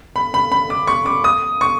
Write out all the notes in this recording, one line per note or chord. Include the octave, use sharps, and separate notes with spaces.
B5
B5
B5
D6
C#6
D6
D#6
C#6